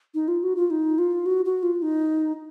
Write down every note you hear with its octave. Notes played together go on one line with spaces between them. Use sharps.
D#4
F4
F#4
F4
D#4
F4
F#4
F#4
F4
D#4